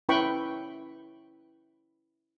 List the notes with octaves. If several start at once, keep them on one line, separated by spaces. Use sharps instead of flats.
C#4 E4 B4 G5 B5 C#6